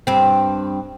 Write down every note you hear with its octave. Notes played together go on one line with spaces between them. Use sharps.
G2 C4